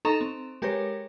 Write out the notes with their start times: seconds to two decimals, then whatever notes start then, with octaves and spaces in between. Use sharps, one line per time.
0.05 D#4 A4 A#5 C#6 E7 F7
0.21 C4
0.62 G#3 G4 G#4 A#4 B4 C#5